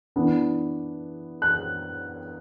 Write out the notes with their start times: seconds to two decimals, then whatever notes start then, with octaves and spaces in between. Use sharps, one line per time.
0.16 E3 B3 D4
1.42 F#6